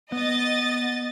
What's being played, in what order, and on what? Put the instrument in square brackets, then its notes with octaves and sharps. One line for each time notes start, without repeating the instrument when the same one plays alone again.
[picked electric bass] B3 [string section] D#5 A6